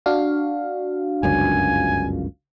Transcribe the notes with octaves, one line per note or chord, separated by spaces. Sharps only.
D4 F#4 F5
G1 C#2 F#2 G#5